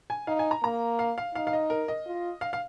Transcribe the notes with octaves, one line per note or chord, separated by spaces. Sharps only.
G#5
D#4 F5
G#5
A#5
A#3 A#5
F5
F5
D#4 F5
F5
D#5
A#4
D#5
F4
F5
F5